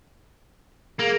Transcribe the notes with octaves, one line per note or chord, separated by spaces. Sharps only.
A#3 G#4 A#4